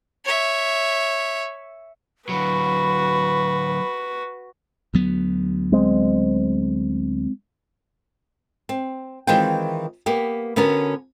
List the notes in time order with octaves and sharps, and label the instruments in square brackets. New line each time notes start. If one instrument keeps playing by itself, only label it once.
[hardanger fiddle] C#5 E5
[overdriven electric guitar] D3 F#3 [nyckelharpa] F#4 B4 [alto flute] B5
[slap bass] D2 F#3 B3
[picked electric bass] G#3 C4
[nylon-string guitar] C4
D#3 E3 G#3 C4 F4 G5
A#3 B3 G4
D3 B3 C#4 F#4 A#4